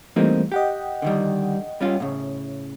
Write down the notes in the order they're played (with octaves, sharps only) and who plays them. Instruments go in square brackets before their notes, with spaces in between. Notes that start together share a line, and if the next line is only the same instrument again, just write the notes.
[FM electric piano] E3 G3 A3 [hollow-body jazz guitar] A#3 C4 D#4
[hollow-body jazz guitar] G4 [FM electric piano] D#5 F#5 G5
[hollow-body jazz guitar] D3 D#3 G3
G3 C#4 F4
A2 C#3